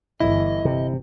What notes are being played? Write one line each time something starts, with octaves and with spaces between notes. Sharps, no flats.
G1 E3 E4 D#5
C3